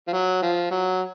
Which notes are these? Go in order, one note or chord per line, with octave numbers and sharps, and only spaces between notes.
F3
F#3
F3
F#3